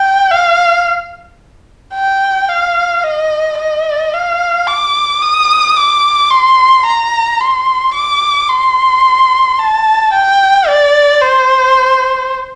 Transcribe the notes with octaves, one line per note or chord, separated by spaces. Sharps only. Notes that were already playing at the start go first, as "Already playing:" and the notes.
Already playing: G5
F5
G5
F5
D#5
D#5
F5
D6
D#6
D6
C6
A#5
C6
D6
C6
A5
G5
D5
C5